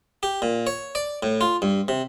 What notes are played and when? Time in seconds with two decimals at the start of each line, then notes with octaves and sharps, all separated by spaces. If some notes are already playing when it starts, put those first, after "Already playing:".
0.23 G4
0.42 A#2
0.67 C#5
0.95 D5
1.23 A2
1.41 F4
1.62 G2
1.88 C3